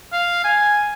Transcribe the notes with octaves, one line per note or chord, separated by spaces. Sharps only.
F5
G#5